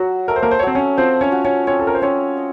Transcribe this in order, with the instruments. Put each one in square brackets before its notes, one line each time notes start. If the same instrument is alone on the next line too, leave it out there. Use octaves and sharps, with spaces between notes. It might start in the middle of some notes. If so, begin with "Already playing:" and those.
Already playing: [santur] F#3 [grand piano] F#4
[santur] A3 [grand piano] A#4
[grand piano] C5
A#3 A#4
C5
C#5
[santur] F#3 [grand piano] C4 C5
[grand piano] C#4 C#5
[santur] F3 [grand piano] C4 C5
[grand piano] C#4 C#5
[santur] F#4
[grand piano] C#4 C#5
[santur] C4 [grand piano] C#4 C#5
[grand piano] A4
A#4
C5
[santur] C4 [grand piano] C#4 C#5
[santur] D#5